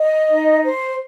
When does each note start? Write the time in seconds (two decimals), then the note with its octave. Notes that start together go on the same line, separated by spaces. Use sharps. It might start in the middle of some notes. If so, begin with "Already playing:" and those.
Already playing: D#5
0.28 D#4
0.63 C5